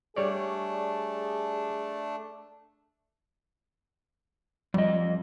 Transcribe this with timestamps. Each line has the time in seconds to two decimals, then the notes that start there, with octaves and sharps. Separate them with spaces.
0.16 G3 A3 D4 G#4 C#5 D5
4.74 F2 G3 D#5